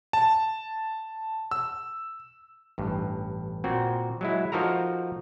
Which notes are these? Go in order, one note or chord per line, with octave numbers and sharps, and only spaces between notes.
A5
E6
A1 G2
A#2 C4 F#4
F#3 G#3 E4
F3 D#4 F#4 A4 A#4 A#5